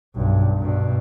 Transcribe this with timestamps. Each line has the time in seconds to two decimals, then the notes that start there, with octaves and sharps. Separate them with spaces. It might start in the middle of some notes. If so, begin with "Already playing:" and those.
0.16 B1 G2
0.56 G2 B2